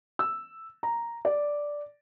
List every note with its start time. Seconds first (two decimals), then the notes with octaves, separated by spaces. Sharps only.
0.19 E6
0.83 A#5
1.25 D5